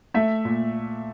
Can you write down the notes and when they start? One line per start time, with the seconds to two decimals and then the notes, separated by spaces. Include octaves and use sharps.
0.14 A3 E5
0.45 A#2